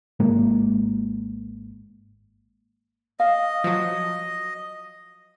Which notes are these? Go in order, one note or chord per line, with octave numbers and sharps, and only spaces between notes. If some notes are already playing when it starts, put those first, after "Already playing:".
G#1 G#2 G#3 A#3
D#5 F5
F3 F#3